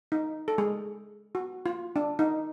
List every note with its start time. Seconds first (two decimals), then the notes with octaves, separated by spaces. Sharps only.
0.12 D#4
0.48 A4
0.58 G#3 G#4
1.35 F#4
1.66 F4
1.96 D4
2.19 D#4